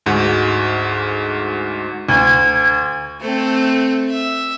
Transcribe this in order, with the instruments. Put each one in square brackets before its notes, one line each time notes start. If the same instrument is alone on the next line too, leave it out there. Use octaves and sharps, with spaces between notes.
[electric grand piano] D2 G#2 F#4
[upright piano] D2 [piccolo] G#6
[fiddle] A3 C4
E5